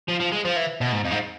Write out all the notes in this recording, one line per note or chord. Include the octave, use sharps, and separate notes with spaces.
F3
F3
G#3
F3
E3
B2
G#2
F2
G#2